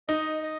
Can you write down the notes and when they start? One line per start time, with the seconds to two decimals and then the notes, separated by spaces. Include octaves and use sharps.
0.08 D#4 D#5
0.43 D#5